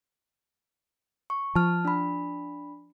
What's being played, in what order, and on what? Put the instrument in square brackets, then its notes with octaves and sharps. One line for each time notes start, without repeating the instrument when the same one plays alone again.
[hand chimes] C#6
[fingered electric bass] F3 [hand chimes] A5 F6
[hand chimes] D4 B5